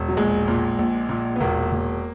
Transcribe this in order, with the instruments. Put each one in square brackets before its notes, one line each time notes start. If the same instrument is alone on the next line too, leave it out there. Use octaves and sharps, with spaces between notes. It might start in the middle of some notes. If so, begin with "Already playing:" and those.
Already playing: [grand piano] E1
F#3
A#1 G#3
A#2
A#1
A#2
B3
E1 A#3
E1